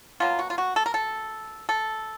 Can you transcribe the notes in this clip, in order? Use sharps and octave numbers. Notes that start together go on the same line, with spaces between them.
B2 F#3 A#3 F4
F#4
F4
F#4
A4
A#4
A4
A4